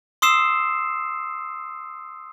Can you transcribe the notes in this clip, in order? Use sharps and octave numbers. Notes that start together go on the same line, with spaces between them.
C6 D#6 E6 C7 E7